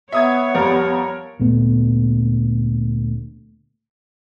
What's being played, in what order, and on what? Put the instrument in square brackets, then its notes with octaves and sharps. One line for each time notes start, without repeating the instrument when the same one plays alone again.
[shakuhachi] B3 [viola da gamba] C#5 [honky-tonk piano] E5 D#6 G#6
[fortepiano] F2 G3 [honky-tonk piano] A#4
[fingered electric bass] D2 A#2 A3 B3